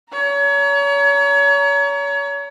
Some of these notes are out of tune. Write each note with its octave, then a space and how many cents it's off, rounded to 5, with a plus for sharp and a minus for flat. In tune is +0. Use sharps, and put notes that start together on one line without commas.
C#5 +30 A#5 +0